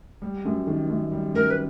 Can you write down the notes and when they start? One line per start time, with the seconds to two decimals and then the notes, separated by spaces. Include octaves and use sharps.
0.22 G3
0.45 F#2
0.67 D#3
0.89 F#2
1.12 G3
1.34 F#2 A#4
1.50 B4